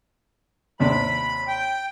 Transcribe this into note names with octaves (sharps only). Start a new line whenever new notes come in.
D#2 C3 D4 B5
G5